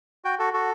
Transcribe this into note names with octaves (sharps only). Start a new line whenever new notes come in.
F#4 G5
F#4 A4
F#4 A4